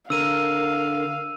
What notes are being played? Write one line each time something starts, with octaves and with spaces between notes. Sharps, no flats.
D3 A#4 F5 E6 D#7